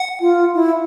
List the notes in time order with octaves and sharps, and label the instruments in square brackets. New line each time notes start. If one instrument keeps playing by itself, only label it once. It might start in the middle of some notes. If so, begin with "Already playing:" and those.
Already playing: [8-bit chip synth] F#5
[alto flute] F4
E4